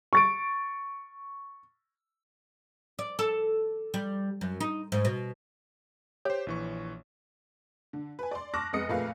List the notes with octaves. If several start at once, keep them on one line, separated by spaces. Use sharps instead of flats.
C#6 A6 D7
D5
A4
G3
F#2
D#4
G#2
B2
G4 C5 C#5
A#1 E3 C#6
D3
B4 G#5
D5 C6
A5 C#6 D6 F6 F#6 A#6
F1 G#3 B3 D#5 D#6 C#7
F2 A#2 A3 G#4 B4 F5